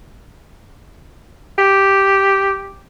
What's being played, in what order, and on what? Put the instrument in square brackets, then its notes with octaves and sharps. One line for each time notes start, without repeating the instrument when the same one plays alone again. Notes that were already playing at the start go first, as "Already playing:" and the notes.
[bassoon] G4